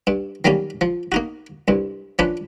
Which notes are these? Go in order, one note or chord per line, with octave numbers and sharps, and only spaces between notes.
G2
D#3 F#3 G3 A#3 C#4
F3
A#3 D#4 F#4
C2 G2
F3 C#4 D4 B4